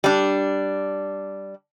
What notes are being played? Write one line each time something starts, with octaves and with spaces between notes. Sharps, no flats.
G3 D4